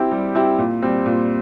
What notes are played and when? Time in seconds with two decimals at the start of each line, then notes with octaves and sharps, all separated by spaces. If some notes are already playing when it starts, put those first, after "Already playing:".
Already playing: C4 E4 G4
0.11 G3
0.35 C4 E4 G4
0.58 A#2
0.82 G3 C4
1.06 A#2